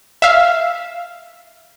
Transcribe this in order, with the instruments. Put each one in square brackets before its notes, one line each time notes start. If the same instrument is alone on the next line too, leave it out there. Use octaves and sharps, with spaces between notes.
[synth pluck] E5 F5